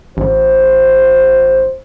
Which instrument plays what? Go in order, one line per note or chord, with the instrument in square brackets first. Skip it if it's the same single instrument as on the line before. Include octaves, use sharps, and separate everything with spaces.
[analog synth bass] A1 [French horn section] F#4 C5